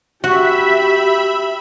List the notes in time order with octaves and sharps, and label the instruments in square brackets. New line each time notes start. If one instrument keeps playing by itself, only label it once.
[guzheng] F#4 [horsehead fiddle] G4 [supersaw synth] E5 B5